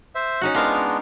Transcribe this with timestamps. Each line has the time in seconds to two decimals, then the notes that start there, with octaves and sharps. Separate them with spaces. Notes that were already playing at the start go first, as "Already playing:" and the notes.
0.15 C5 E5
0.41 C#4 D#4 F#4
0.54 G#3 B3 D4 F4 A#4 F5